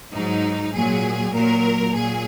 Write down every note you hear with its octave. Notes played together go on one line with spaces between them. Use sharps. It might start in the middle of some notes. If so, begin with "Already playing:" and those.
G#2 F#3 D#4
A#2 F#3 G#4
A#2 F#3 A#4
A#2 F#3 G#4